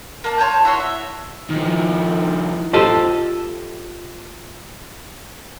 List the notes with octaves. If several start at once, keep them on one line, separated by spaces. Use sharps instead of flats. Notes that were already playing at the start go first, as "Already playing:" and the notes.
A#3 A5
F4 C#5 A5 G6
E4 F#4 C#5 C6
E5
D#3 F3
F4 G4 A4 C5 D#5